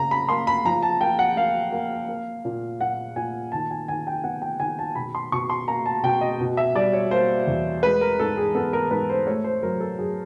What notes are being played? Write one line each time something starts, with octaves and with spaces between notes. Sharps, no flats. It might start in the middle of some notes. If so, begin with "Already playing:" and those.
Already playing: C#3 A#3 A#5
B5
A#3 C6
B5
F3 A#5
A5
A#3 G5
F#5
A#3 F5
A#3
A#3
A#2
A#2 F#5
A#2 G#5
D#3 A5
G#5
D#3 G#5
G5
B3 F#5
G5
D#3 G#5
A5
B2 B5
C6
B2 C#6
C6
A#3 A#5
A5
B2 G5
D#5
B2
E5
G3 D5
C#5
A#3 C5
E2
G#3 B4
A#4
G#2 A4
G#4
B3 A4
A#4
G#2 B4
C5
A3 C#5
C5
F#3 A#4
A4
F#3 G#4